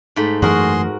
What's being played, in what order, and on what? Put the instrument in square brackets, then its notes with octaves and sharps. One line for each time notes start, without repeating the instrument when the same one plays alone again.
[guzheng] G#2 A3 B5
[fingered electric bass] F#2 E3 A3 [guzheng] F#4 A#4 [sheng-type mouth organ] G#4 C6